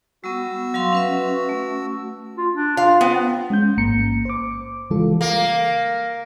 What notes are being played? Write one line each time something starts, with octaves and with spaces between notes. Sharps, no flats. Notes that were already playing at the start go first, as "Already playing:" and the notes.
G3 B3 F#4 E6
F#3 F5 C6
C#4 B4 E5
A3
F4
D4
F4 F5
B3 C4
G#3 C#4 G6
A1 G#2 A#3 A#5 C#7
C5 D6
C#3 E3 G3 G#3 F4 A4
A#3